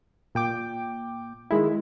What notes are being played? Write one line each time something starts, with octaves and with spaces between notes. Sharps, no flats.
A#2 G5 D6
D#3 G#3 E4